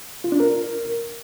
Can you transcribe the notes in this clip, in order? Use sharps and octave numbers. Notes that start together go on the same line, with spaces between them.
F4
D4
A#4